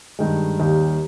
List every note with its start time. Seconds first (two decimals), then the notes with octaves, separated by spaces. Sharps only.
0.19 G2 D#3 G#3
0.59 D#2 D#3 G3